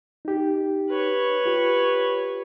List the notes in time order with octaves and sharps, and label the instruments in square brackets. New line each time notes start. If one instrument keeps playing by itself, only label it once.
[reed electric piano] D#4 G4
[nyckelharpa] B4 C#5
[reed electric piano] F4 G4